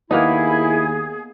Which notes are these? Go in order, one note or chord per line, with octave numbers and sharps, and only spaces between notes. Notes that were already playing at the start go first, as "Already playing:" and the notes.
D#2 A#3 B3 D#4 E4 G#4